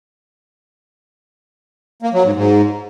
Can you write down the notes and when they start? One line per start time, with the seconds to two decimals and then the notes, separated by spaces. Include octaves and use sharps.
2.03 A#3
2.13 F#3
2.24 G#2
2.34 G#2